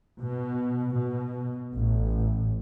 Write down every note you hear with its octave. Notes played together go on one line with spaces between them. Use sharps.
B2
B2
A1